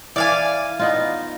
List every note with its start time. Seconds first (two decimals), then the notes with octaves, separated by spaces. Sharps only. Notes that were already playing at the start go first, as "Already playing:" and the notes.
0.16 E3 D5 F5 G#5
0.79 B3 D#4 F4